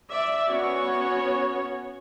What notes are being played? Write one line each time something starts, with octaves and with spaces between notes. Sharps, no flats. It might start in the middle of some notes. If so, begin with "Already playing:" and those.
D5 E5
B3 C#4 F#4 C#5